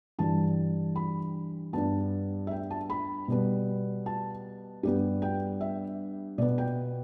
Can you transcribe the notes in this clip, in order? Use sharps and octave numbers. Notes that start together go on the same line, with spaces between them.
G2 E3 G3 A5
B5
G2 G3 B3 A5
E5
G5
A5
B5
B2 G3 B3
A5
G2 G3 B3 G4
G5
E5
B2 B3 D5
G5